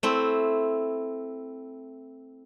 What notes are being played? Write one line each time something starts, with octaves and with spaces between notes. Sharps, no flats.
A3 C4 E4